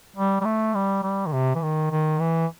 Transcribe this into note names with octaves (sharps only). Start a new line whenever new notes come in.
G3
G3
A3
G3
G3
D#3
C3
E3
D#3
D#3
E3